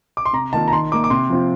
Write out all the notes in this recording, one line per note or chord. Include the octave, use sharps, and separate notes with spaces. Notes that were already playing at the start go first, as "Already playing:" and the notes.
D6
C6
C3 A#5
D#3 A#3 F4 A5
A#5
D#3 C6
A#3 D#4 D6
D6
C3 C6
F3 C4 F4